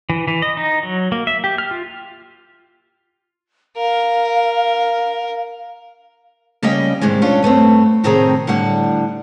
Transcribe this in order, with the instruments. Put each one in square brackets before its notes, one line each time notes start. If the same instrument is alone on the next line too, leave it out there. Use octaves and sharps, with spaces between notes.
[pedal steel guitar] E3
E3
D#5
D#4
F#3
A#3
E5
G4
F6
F4
[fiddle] A#4 [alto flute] F5
[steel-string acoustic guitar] C#3 G3 A#3 C#4 D#5 G5
G#2 C3 D#3 G3 G#3
C#4 D4 F4 A4
G2 A3 B3 C4
A2 C3 D#3 C4 G#4 A#5
A2 D3 G3 F#5